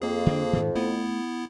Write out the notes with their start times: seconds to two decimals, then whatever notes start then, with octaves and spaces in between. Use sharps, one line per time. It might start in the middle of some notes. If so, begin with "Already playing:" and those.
0.02 F2 A#3 G#4
0.26 D3 D4
0.53 G#2 D#3
0.75 A3 B3 E4